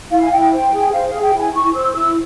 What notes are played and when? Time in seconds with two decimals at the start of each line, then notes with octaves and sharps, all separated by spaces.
0.11 E4 F5
0.22 G#5
0.32 E4 G5
0.51 C5
0.72 G#4
0.92 C5 F5
1.07 F5
1.13 G#4
1.23 G5
1.34 E4 G#5
1.54 E4 C#6
1.74 C5 E6
1.94 E4 E6